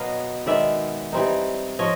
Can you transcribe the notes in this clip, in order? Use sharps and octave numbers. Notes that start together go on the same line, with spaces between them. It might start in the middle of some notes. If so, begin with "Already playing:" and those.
Already playing: B2 F#3 B3 D#5 F5
D#3 G#3 B3 D5 E5
E3 G3 C4 D#4
F3 C#5 D#5